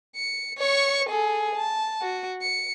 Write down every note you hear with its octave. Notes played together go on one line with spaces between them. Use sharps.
C#7
C#5 C#6
G#4 A4
A5
F#4
C#7